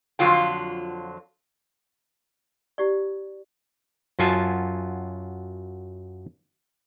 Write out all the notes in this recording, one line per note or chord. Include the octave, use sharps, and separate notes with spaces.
F2 D3 F3 F#3 F4 G5
E4 G4 D5
F#2 F#3 F4 G#5 A5